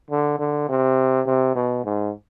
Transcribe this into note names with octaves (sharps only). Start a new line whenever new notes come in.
D3
D3
C3
C3
B2
G#2